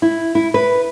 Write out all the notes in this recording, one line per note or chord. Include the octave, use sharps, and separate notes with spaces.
E4
E4
B4